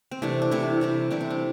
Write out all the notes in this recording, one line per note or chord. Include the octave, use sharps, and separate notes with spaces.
C4
C3 E3 A3 D4
D4
C3 E3 A3 E4
C3 E3 G3
C3 E3 G3 D4
C4
D4